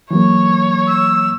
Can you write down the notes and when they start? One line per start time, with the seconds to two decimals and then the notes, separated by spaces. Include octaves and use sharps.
0.11 E3 F#3 A#3 C#5
0.87 E6